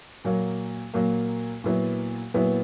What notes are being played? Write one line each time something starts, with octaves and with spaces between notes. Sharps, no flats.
A#2 F#3 A#3
A#2 F#3 A#3
A#2 F#3 B3 E4
A#2 F#3 B3 E4